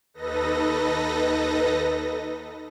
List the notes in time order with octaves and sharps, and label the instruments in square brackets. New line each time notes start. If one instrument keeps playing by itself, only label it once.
[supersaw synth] D#2 D#4 A4 B4 D#5 A#6